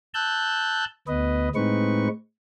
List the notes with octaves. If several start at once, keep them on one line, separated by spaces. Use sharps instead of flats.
A5 E6 F#6 G6
D2 B3 B4 D#5
A2 G#3 C4 D#4 B4 C#6